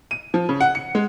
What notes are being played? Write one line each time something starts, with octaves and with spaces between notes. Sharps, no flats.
D#7
F3
C#3
F#5
C#7
G#3